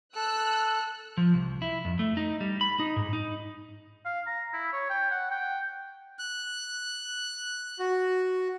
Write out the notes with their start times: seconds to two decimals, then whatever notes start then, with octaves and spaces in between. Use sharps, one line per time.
0.16 A4 E6 F#6
1.17 F3
1.34 C2
1.62 E4
1.85 F2
1.99 A3
2.17 D#4
2.41 G3
2.61 B5
2.80 D#4
2.96 G#2
3.13 D#4
4.05 F5
4.26 A#5
4.53 E4
4.73 C#5
4.90 G5
5.11 F#5
5.31 G5
6.19 F#6
7.79 F#4